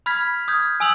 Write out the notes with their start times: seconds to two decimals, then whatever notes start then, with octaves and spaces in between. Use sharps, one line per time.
0.06 B5 F6 G#6 B6
0.48 D#6 F6 G6 G#6
0.80 G#5 D#6 E6 F7 F#7